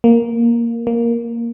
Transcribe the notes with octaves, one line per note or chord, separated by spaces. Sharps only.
A#3
A#3